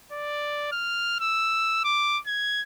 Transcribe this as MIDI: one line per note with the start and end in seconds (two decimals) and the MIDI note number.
0.12 0.68 74
0.72 1.18 89
1.20 1.82 88
1.84 2.18 86
2.27 2.62 92